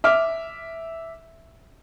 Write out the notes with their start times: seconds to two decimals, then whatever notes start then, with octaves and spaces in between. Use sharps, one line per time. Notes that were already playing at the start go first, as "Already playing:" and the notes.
0.04 E5 D6 F6